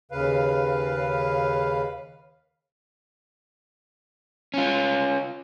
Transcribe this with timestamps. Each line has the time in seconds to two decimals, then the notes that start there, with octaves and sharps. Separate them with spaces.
0.11 D#2 C#3 B4 F5
4.54 C#4 F4